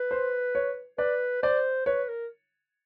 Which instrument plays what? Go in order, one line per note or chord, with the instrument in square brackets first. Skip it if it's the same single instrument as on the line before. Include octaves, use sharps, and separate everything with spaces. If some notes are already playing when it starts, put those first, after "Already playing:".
Already playing: [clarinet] B4
[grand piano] C5
C#5
[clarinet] B4 [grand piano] D5
[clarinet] C5 [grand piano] D5
[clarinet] B4 [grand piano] C#5
[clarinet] A#4